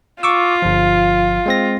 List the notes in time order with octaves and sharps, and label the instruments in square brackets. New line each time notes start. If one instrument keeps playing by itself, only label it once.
[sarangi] F4 [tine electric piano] C#6 D6 E6
[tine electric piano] G1 F3
G#3 C4 A#6